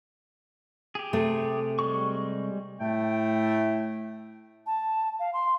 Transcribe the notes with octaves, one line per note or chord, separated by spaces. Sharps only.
G4 G#4
C3 A3
G3 G#3 C#6
A2 A3 G5
A5
F5
C6